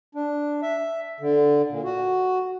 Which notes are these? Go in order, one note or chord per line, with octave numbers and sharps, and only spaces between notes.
D4
E5
D3
A#2
F#4